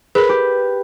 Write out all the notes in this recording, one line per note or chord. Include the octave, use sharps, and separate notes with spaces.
G#4 A#4 B4
G4